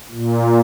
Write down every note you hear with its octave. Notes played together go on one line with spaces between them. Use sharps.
A#2